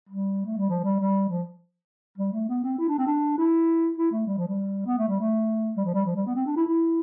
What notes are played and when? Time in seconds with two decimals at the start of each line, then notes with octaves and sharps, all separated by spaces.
0.09 G3
0.45 A3
0.57 G3
0.69 F3
0.84 G3
0.99 G3
1.29 F3
2.18 G3
2.32 A3
2.49 B3
2.63 C4
2.78 E4
2.88 D4
2.98 C4
3.07 D4
3.38 E4
3.97 E4
4.12 A3
4.27 G3
4.37 F3
4.47 G3
4.86 B3
4.98 A3
5.08 G3
5.20 A3
5.77 G3
5.85 F3
5.94 G3
6.06 F3
6.16 G3
6.26 B3
6.36 C4
6.46 D4
6.56 E4
6.66 E4